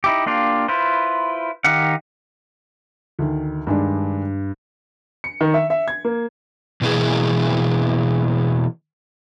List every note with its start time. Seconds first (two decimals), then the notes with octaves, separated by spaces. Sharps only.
0.04 D#4 E4 G4
0.26 A#3 D4 F4 G4
0.68 E4 F4 B4 C5
1.64 D#3 D#4 G4 F5 F#5
3.19 D2 D#3
3.67 G2 D#3 G#3 D4
5.24 C#7
5.41 D#3
5.54 E5
5.70 E5
5.88 G#6
6.05 A#3
6.82 B2 E3 A#3 G#4